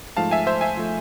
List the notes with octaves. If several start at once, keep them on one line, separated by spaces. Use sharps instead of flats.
G#2 F3 A3 F5 A5
E5 G#5
C5 E5
E5 G#5
F3 A3